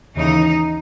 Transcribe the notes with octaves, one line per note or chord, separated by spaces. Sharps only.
D#2 C#3 E3 D#4